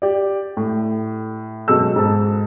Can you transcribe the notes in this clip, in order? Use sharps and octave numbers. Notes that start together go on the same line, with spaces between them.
G4 D5
A2
F#2 B2 G#3 A4 E6
G#2 A5